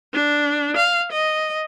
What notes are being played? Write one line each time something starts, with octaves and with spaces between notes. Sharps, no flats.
D4
F5
D#5